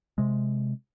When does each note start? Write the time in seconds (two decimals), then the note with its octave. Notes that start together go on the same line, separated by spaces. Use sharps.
0.18 C3 G#3